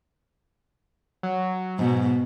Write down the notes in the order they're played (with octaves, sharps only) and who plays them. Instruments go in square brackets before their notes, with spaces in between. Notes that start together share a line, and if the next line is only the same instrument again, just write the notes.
[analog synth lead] F#3
[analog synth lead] G#2 [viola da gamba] B2